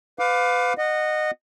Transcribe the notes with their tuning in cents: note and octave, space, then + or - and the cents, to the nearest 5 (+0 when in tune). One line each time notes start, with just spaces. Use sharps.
B4 +30 F5 +30 D6 +0
D#5 -20 F#5 -10